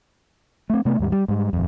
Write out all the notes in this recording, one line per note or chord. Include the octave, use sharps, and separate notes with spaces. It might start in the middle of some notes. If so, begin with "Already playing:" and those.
A3 C4
C3 A3 B3
D#2 G#2 G3
G3
G#2 G3
D#1 F2